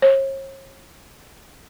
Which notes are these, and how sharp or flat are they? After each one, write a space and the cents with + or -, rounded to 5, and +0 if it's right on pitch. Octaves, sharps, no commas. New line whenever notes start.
C#5 -45